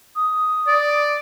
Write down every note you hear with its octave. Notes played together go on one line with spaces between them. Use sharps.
D#6
D5